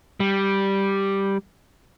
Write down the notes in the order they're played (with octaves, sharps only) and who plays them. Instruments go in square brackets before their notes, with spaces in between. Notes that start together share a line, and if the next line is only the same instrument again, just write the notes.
[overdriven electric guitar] G3